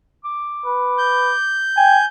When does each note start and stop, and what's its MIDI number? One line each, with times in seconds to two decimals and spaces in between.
0.25 1.64 86
0.66 1.33 71
0.98 2.05 91
1.77 1.98 79
1.77 2.04 80